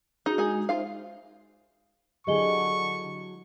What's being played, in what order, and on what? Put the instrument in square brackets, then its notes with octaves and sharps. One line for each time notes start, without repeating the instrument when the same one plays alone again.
[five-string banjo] D#4 [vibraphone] F#4 G#4
[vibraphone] G#3 [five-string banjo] D#4 G#4
[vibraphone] D#4 C5 E5 [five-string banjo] F4 F5
[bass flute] D3 [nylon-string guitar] F#3 E4 G#4 [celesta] G4 D#5 G7 [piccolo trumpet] C#6